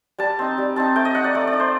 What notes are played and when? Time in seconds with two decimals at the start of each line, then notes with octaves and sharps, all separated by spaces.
0.18 G3 A5
0.39 C4 D#4
0.58 G3
0.76 C4 D#4 A5
0.96 A3 G5
1.05 D#5
1.15 D#4 F#5
1.24 D5
1.34 A3 D5
1.47 D5
1.53 D#4
1.60 C5